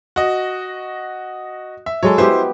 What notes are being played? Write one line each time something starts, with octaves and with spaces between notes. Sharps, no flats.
F#4 D#5
E5
F#3 G#3 A4 C#5
B3 E4 G4 C5